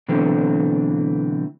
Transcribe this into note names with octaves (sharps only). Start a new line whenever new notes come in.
B2 D3 E3 F#3 A3 C4